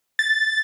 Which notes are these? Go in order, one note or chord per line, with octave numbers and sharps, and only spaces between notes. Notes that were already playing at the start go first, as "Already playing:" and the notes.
A6